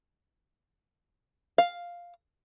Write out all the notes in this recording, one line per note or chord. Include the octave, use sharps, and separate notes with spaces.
F5